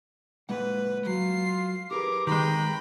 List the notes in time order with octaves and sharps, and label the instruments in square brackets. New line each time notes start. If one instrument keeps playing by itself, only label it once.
[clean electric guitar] A#2 G#3 F#5 [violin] B4
[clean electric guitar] F#3 [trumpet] F4 [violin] C7
[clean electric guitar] G4 G#4 B4 [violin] A#4 [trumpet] D6
[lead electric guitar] D#3 G#3 [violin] G5 B5 [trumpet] A#5